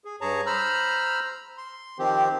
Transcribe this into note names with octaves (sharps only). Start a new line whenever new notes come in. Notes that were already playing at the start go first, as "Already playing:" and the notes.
G#4
G2 G#4 C#5 A5 A#5
C5 A#5 B5 E6 F6
C6
D#3 F3 C4 G4